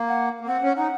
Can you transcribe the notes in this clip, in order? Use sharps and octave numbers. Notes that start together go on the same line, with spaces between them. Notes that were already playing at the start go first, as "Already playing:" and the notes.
Already playing: A#3
F#5
A#3
C4 F#5
C#4
D#4 F#5